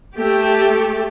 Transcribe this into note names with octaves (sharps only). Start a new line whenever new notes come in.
A3 G4